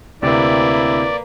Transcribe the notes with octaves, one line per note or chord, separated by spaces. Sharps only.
D2 C3 A#3 C4 E4 B4 D5